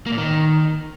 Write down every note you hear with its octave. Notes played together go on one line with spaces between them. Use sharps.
A#3
A#2
D#3